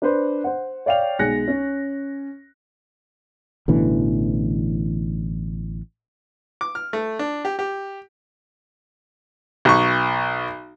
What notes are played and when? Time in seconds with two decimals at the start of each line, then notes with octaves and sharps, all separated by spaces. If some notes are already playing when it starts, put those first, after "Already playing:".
0.02 D4 B4 C5
0.44 C5 F#5
0.86 C#5 D5 F5 G5 F7
1.19 B1 G#3 G#5 F#6 A#6 C#7
1.48 C#4
3.68 A1 B2 D3 E3
6.61 D6
6.75 F6
6.93 A3
7.19 D4
7.45 G4
7.59 G4
9.65 B1 C#6